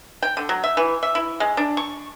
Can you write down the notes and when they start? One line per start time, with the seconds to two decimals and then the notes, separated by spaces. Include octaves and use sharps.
0.22 G5
0.37 D3
0.49 F#3
0.64 E5
0.77 E3
1.03 E5
1.15 E4
1.40 G#3
1.57 D4
1.77 C#6